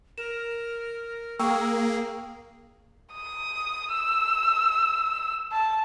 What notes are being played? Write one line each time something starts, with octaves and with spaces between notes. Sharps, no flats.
A#4 E7
A#3 G#4 G5 C#6 E6
D#6
E6
A5